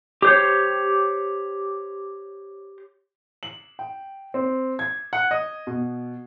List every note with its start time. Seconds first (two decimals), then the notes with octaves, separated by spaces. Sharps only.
0.22 G4 C5 C#5
3.43 F#7
3.79 G5
4.34 C4
4.79 G#6
5.13 F#5
5.31 D#5
5.67 B2